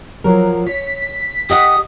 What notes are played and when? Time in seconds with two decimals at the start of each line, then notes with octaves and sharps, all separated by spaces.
0.24 F3 F#3 A#4
0.67 C#5 B6
1.50 G4 D#5 F#5 D#6